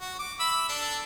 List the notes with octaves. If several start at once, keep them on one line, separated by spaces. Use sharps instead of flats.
F#4
D6
E5 B5
D4 A4